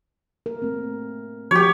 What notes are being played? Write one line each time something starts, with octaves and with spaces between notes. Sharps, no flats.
A#4
A3 C4
F3 F#4 G4 C#5